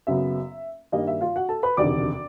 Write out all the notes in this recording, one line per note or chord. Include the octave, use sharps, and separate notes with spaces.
F#1 F#2 C#3 F#3 B3 E5
G2 D#3 G3 A#3 D#5
E5
F4 F5
F#4 F#5
A4 A5
B4 B5
E1 D2 C3 D#3 D5 D6